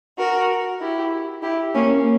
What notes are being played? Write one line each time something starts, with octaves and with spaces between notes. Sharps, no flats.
F#4 A#4
E4 G4
E4 G4
A#3 C#4